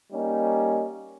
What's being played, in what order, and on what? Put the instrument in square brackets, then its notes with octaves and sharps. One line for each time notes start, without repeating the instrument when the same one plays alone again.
[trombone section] G3 A#3 C#4 D#4